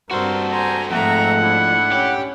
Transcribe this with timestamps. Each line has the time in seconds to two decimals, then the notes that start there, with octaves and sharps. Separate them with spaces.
0.11 G2 C4 F#4 A4 A#4 C5
0.51 C5 G#5 A#5
0.91 F2 G#2 A3 E5 F#5 A#5
1.41 D4 E4
1.92 C#4 G4